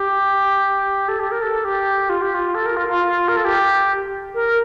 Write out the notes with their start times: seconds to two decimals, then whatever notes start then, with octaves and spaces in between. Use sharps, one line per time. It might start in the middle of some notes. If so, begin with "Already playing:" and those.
Already playing: G4
1.08 A4
1.19 G4
1.31 A#4
1.42 A4
1.64 G4
2.09 F4
2.22 G4
2.35 F4
2.55 A4
2.66 A#4
2.77 F4
2.88 F4
3.28 A#4
3.37 A4
3.45 G4
4.34 A#4